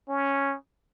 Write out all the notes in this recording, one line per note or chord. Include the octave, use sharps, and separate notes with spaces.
C#4